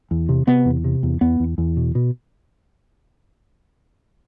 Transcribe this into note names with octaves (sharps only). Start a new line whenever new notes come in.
E2
C3
C3 B3
E2
C3
E2
E2 B3
E2
E2
B2
B2